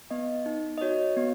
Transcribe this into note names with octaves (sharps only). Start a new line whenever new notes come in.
B3 D#5
D#4
D#5
F#4 C#5
B3